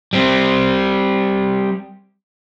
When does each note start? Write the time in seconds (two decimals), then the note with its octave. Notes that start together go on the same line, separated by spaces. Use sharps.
0.13 G3 C4